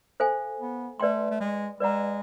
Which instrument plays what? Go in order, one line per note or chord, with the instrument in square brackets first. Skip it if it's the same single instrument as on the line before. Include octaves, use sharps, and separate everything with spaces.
[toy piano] A4 C5 F5 G#5
[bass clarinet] B3
[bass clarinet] A3 [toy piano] B4 D5 G5 C6
[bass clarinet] A3
G#3
[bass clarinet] G#3 [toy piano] B4 D5 F#5 A#5